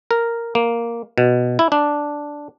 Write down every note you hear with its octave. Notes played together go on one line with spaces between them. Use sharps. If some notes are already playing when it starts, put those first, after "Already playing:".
A#4
A#3
B2
E4
D4